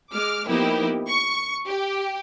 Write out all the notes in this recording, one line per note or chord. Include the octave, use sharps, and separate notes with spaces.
G#3 D6 F6
F3 A#3 B3 D#4 E4 G4
C#6
G4